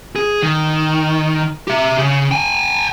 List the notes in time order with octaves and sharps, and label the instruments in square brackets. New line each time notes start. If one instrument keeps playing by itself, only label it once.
[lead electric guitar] G#4
D#3
G4 E5
C#3
G5 G#5